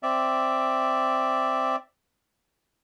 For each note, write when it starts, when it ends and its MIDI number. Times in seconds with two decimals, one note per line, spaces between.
0.03 1.76 60
0.03 1.76 74
0.03 1.76 76